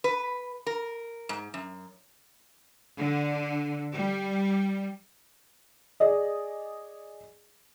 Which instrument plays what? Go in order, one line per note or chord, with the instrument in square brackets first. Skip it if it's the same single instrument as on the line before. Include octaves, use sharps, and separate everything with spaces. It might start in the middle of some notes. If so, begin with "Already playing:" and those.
[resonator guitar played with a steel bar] B4
A#4
G#2
F#2
[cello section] D3
G3
[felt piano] G#4 D5 D#5